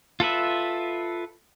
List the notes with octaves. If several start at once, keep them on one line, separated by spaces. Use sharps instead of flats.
F4 A4 B4 E5